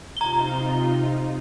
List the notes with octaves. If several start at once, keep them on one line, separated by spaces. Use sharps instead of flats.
C3 D#4 F4 A#5 G7